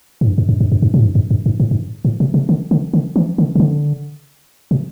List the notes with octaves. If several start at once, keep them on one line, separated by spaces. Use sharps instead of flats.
A2
G2
F#2
F#2
F#2
F#2
G2
B2
A2
G2
F#2
F#2
G2
A2
G2
A2
B2
C3
D3
D3
D3
E3
D3
C3
D3
B2